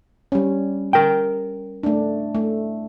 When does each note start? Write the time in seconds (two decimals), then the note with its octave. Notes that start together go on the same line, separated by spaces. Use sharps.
0.32 G3 C#4
0.93 A#4 G5
1.83 A3 D4
2.35 A3